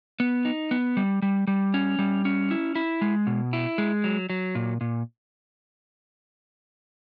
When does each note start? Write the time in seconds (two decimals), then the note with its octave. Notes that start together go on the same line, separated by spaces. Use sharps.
0.20 B3
0.45 D#4
0.71 B3
0.97 G3
1.22 G3
1.47 G3
1.74 C#4
1.99 G3
2.25 C#4
2.51 E4
2.75 E4
3.01 G#3
3.27 B2
3.53 E4
3.78 G#3
4.04 F#3
4.30 F#3
4.55 A#2
4.81 A#2